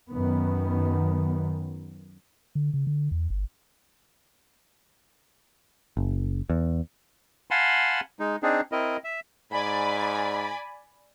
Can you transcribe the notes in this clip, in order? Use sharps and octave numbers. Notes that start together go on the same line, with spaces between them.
F#2 D#3 B3
D3
C#3
D3
E2
G1
F#1
E2
F5 F#5 G#5 A5 B5 C6
G#3 D#4
C4 D4 D#4 G#4
C4 E4 A#4 D#5
E5
G#2 D5 G#5 B5